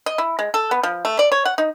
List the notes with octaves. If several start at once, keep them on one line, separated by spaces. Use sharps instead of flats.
D#5
E4
G#3
A4
B3
F3
A3
D5
C#5
F#5
D#4